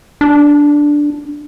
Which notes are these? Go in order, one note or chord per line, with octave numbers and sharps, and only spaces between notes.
D4